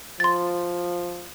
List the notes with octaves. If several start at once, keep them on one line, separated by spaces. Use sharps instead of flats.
F3 C6 A6